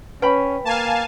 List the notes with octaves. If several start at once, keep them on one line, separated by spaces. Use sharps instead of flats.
C#4 B4 G5 B5
A#3 F5 G#5 A5